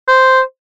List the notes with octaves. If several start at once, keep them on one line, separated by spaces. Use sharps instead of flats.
C5